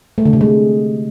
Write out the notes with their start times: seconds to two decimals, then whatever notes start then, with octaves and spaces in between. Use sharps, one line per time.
0.18 A3
0.25 D3
0.33 C3
0.41 G#3